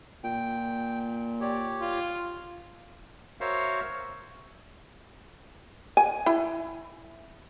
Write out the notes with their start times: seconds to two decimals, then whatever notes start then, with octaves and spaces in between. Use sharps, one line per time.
0.24 A#2 G5
1.41 G4 C#5 D5
1.81 F4
3.41 F#4 A#4 C5 C#5 E5 F5
5.97 G#5
6.26 E4